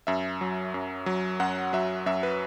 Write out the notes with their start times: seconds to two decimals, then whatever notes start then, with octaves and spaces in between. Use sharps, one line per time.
0.07 F#2 E5
0.41 F#3
0.74 F#2
1.06 F#3
1.40 F#2 F#5
1.73 F#3 E5
2.06 F#2 E5
2.23 B4